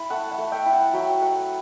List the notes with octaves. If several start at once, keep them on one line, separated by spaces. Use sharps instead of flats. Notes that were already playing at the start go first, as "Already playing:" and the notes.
Already playing: E4 B5
A3 F#5 A5
F#5 A5
A3
E5 G5
E4
F#5 A5
F#3 G5 B5
A3 F#5 A5